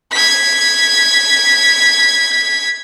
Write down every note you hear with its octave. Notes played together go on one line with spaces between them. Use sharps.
G#6 B6